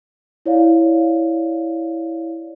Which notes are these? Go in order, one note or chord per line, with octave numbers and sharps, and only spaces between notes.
E4 C#5 D5 F5